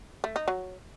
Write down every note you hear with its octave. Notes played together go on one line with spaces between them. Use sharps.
A3
D#4
F#3